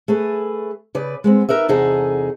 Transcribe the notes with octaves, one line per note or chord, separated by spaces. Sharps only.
A3 G#4 B4
C#3 B4 D5
G#3 B3 C4
D#4 A#4 B4 E5
E2 C3 D#4 G#4 A4 F#5